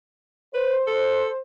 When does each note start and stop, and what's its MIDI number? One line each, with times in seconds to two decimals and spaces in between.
0.54 0.76 71
0.54 1.37 72
0.87 1.30 69